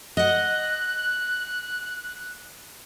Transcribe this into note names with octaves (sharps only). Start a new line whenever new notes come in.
D#5 F#5 F#6